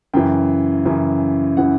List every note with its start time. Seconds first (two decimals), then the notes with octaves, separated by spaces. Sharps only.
0.14 F#2 C#3 E3 G5
0.85 F#2 C#3 E3
1.57 C#3 E3 F#5